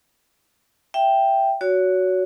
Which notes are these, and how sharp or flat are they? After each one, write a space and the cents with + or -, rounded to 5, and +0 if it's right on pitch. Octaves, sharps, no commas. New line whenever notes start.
E5 +10 G5 +0
F#4 +0 C#5 +30